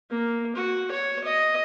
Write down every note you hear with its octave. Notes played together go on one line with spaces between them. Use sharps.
A#3
F#4
C#5
D#5